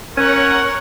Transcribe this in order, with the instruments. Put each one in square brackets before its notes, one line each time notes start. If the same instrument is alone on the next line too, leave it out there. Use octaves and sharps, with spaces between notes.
[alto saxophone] C#4 [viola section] A#4 C#5 F#5